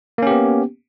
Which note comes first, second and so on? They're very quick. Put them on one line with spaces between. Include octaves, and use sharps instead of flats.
A#3 C#4 G4 B3